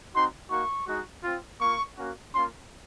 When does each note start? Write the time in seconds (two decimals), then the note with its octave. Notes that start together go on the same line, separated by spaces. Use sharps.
0.14 C4 D#4 F#4 C6
0.51 A#3 D#4 F#4 C#6
0.88 G#3 D#4 F#4
1.24 C4 F4
1.61 A#3 F4 C#6
1.98 A#3 C#4 F#4
2.34 A#3 C#4 F4 C6